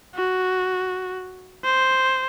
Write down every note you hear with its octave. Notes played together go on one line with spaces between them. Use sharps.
F#4
C5